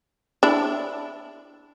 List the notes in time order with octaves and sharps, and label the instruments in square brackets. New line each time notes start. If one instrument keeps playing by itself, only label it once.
[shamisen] D4 E4